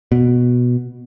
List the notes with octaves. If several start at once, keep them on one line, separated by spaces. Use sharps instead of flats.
B2